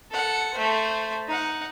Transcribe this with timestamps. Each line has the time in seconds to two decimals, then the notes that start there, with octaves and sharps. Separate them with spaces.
0.11 A4 F#5
0.53 A3 C5
1.28 D#4 F#5